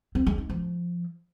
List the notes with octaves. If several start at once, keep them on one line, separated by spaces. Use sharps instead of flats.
C4
G#3
D#4
F3